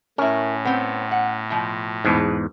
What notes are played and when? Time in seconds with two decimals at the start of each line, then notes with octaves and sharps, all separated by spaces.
0.18 A2 C#4 E4 A#4
0.65 B3 C4
1.11 F#5
1.50 B2 F3
2.05 E2 G#2 B2 B4